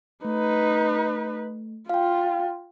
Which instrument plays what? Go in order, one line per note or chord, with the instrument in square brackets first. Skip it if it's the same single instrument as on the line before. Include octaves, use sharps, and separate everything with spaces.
[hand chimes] A3 [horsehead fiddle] D#4 B4
[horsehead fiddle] F4 [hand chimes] F5 G5